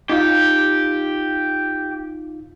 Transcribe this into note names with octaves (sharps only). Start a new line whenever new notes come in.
D#4 F4 G4 F5